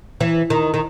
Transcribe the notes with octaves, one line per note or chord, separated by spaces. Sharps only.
E3
D#3
D#3